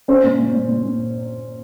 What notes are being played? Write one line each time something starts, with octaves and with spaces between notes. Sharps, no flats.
C#4 C5
A#2
A#2
A#2
A#2
A#2